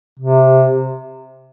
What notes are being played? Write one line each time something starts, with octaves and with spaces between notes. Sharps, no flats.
C3